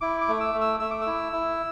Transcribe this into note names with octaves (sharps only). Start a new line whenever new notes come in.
E4 D6
D6
A3
E6
A3
E6
A3 E6
D6
E6
E4
E4